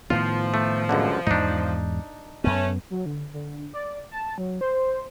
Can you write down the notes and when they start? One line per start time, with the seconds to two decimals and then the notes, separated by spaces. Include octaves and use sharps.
0.10 A2 D#3 F3 B3 F4
0.54 A3
0.89 C#2 F#2 D3
1.27 E2 G#2 D4 D#4
2.44 F#2 A3 B3 C#4
2.91 F#3
3.06 D3
3.33 D3
3.74 D5
4.11 A5
4.38 F#3
4.61 C5